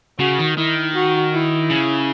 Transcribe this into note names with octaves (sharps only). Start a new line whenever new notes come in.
C#3 F#4
D#3
D#3 E4
F#4
E4
C#3